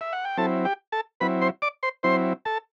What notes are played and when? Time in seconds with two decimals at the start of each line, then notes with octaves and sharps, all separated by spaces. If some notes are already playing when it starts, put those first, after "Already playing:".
0.01 E5
0.13 F#5
0.25 G5
0.37 F#3 C4 E4 A4 A5
0.65 G4 G5
0.92 A4 A5
1.20 F#3 C4 E4 B4 B5
1.41 C5 C6
1.62 D5 D6
1.83 C5 C6
2.03 F#3 C4 E4 C5 C6
2.45 A4 A5